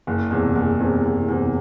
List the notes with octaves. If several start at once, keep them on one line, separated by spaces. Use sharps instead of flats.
F#1
E2 C3
F#1
E2 C3
F#1
E2 C3